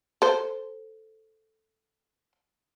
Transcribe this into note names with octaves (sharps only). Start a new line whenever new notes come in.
A4 C5